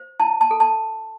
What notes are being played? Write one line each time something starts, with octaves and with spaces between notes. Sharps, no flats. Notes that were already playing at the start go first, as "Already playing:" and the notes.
Already playing: C5
E4 A5
A5
A4
A5